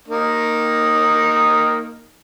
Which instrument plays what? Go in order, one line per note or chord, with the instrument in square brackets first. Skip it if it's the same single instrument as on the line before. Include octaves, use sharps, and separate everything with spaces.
[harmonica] A#3 D#4